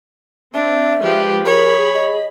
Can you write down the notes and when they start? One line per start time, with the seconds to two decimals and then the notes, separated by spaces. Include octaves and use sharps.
0.54 C4 D4 E5
1.03 F3 G#3 G4 B4
1.46 G#4 A#4 C#5 B5
1.94 D#5